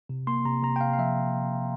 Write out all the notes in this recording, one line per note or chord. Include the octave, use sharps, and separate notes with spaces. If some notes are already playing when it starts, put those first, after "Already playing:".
C3
A#3 C6
C3 A#5
C3 A#5
G5
C3 F5
F5
F3 E5